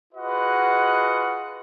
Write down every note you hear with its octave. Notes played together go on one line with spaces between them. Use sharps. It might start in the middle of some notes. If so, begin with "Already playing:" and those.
F4 F#4 G#4 B4 D#5 F#5